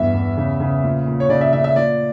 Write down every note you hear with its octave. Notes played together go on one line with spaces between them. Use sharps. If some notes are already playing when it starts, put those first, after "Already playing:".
Already playing: E2 G2 E5
E2
C#3
C#3
A#2
A#2
C#5
C#3 D5
E5
C#3 E5
E5
A#2 D5